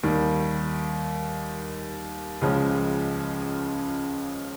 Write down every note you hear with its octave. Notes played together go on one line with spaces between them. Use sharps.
D#2 D#3 G3
C#2 C#3 F3 G#3 C#4